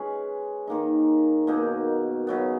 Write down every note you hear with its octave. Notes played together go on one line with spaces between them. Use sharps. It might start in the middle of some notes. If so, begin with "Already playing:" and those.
Already playing: G#3 C#4 G#4 B4
D#3 A#3 D#4
B2 A#3 D#4
C#3 F#3 B3